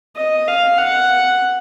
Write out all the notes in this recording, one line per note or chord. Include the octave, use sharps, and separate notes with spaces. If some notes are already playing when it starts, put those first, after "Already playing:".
D#5
F5
F#5